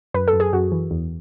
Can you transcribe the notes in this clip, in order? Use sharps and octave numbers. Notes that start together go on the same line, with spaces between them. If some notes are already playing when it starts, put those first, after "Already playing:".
F#2 B4
A4
F#2
G#4
F#2 F#4
E3
E2